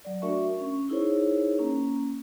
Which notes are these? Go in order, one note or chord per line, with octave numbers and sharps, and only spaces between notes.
F#3 D5
A3 D4 F#4 A#4 E5 C#6
C#4 C#6
D#4 E4 G#4 A#4 C5 C#5
A#3 C#4